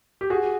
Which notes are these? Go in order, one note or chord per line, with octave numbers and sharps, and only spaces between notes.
G4
F#4 G#4